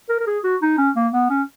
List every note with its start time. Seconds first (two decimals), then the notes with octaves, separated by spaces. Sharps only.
0.09 A#4
0.20 A#4
0.27 G#4
0.44 F#4
0.62 D#4
0.78 C#4
0.96 A#3
1.13 B3
1.30 C#4